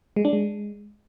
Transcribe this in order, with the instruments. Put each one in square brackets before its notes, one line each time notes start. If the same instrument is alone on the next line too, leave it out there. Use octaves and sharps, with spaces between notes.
[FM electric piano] G#3
D4
G#3